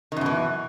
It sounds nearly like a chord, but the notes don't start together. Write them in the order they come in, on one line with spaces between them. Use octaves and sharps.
D#3 F#2 B2 E3